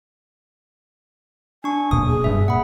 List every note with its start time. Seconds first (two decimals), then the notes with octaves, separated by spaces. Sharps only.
1.64 D4 G#5 C#6
1.91 D#1 B1 A#2 D#6
2.08 G#4
2.24 F#1 G2 E5
2.48 A#2 F#5 B5